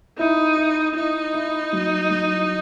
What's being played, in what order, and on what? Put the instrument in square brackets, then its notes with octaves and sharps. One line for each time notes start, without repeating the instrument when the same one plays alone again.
[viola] D#4 [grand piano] E4
[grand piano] E4
[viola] D#4 [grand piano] E4
[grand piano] E4
F#3
F#3